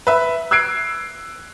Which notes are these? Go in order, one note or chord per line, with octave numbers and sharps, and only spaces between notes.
B4 E5
E6 F#6 G#6 C7 D7